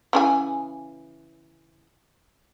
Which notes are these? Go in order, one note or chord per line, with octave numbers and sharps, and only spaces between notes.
C#3 E3 G#5